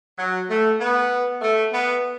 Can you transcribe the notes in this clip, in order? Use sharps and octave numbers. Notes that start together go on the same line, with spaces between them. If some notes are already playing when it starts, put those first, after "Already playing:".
F#3
A3
B3
A3
B3